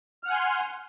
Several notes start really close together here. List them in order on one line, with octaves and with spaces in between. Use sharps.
F6 F#5 G#5 C6